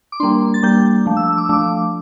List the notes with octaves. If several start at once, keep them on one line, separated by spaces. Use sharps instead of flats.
D6
G3 A#3 D4 C6
A6
G3 A#3 D4 G6
F3 A3 D4
E6
E6
D6
E6
F3 A3 D4 D6